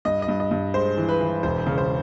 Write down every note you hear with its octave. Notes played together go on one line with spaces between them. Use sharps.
G2 D#5
D#5
G2
D#5
G2
G#3 C5
E3
B4
E3
E1 C5
C#3
C5